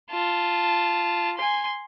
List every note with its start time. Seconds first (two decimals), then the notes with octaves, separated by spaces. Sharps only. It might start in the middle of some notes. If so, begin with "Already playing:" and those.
0.11 F4 A5
1.38 G#5 C6